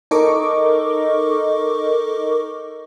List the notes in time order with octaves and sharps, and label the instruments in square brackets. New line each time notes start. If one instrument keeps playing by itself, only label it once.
[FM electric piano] D#4 A4 A#4 D#5 C#6 D6